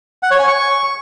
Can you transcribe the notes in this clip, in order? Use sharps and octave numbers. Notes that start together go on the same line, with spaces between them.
F#5
C#5
G#5
C#6